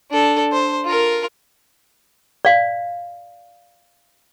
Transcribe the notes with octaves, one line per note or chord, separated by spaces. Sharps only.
D4 A4
C5
F4 A#4
D5 F5